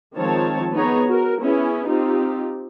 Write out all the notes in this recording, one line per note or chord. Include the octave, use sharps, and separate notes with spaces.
D#3 F3 G#3 C4 C#5 A5
B3 D#4 G#4 C#5 A#5
F#4 A#4
B3 C#4 E4 G#4
C4 D#4 F4 G4